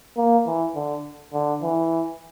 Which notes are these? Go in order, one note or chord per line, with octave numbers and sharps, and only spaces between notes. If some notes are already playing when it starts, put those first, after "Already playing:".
A#3
E3
D3
D3
E3